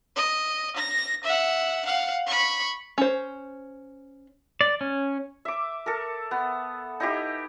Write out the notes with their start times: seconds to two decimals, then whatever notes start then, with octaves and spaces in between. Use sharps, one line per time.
0.16 D#5
0.76 A#6
1.24 E5 F#5
1.85 F5 F#5
2.26 B5 C#6
2.98 C#4 C5
4.61 D5
4.81 C#4
5.45 E5 D6
5.86 A4 A#4
6.31 B3
7.00 D#4 E4 G4